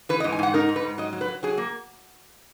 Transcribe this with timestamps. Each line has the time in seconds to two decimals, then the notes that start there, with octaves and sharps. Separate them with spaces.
0.09 E3 B4
0.20 D#5
0.24 G#2
0.32 G#5
0.39 G#2 F#5
0.54 D#4 A#4
0.69 G#2
0.76 B4
0.84 G#2
0.98 F#3 D#5
1.13 F#3
1.21 B4
1.28 F#3
1.43 F#3 G#4
1.58 A#3